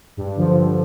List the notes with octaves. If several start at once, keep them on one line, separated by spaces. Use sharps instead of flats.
G2
D3 F3
G2